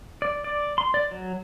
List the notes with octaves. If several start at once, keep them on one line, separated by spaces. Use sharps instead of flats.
D5
D5
C6
D5
F#3